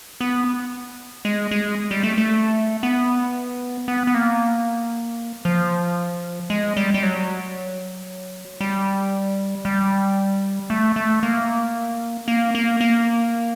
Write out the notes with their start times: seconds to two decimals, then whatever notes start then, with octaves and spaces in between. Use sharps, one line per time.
0.21 B3
1.25 G#3
1.51 G#3
1.91 G3
2.03 A3
2.18 A3
2.83 B3
3.88 B3
4.07 B3
4.14 A#3
5.45 F3
6.50 G#3
6.77 G3
6.94 G3
7.03 F#3
8.61 G3
9.65 G3
10.70 A3
10.96 A3
11.23 A#3
12.28 A#3
12.55 A#3
12.81 A#3